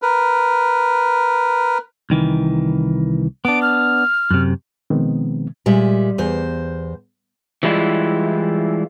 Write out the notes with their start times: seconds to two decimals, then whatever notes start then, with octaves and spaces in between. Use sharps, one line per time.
0.02 A#4 B4
2.10 C2 D#3 E3
3.45 B3 D4 D7
3.62 F6
4.31 F#2 C3
4.90 B2 D#3 F3 G#3 B3 C4
5.66 A#2 G3 G#3 E5
6.18 E2 C5
7.63 E3 G3 G#3 E4 F4